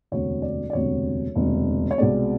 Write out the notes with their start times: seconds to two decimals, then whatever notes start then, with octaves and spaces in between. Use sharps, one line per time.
0.12 E1 D2 C3 C#5
0.42 D5
0.70 D5
0.73 E1 D2 C3 C#5
1.36 E1 D2 C3
1.91 C#5
1.98 C2 B2 G#3 C4 D5